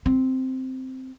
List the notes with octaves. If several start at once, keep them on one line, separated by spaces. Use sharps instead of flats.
C4